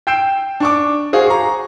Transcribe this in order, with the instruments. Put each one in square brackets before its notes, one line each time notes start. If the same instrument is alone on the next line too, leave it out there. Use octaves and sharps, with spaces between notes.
[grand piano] G5 E6 G6 C7 D7 E7
D4 C#6 D6
F#4 G#4 C5 F5
A#5 C#6